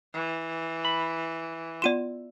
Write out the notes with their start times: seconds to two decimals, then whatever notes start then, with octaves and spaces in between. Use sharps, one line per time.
0.14 E3
0.85 B5
1.82 B3 F4 D5 C6 D#7 E7